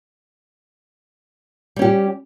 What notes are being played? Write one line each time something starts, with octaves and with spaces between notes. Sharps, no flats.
G3 C#4 G4